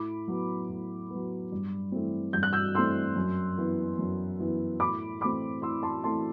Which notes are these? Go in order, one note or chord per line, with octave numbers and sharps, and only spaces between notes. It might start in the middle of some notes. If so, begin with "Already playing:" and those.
Already playing: A2 B5 D6
F#3 B3
A2
F#3 B3
G2
E3 A3 C4
G2 G6
F#6
E6 G6
E3 A3 C4 C6 E6
F#2
E3 B3
F#2
E3 B3
A2 B5 D6
E3 A3 C4 B5 D6
A2 C6 E6
A5 C6
E3 A3 C4 A5 C6